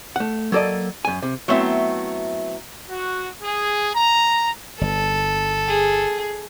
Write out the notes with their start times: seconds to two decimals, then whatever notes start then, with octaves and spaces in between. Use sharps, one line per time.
0.16 A3 F#5
0.52 F#3 A#3 A4 D5 D#5
1.05 F#2 G#5
1.22 C3
1.48 F#3 A3 B3 C4 E4 E5
2.89 F#4
3.43 G#4
3.95 A#5
4.81 G1 A4
5.68 G#4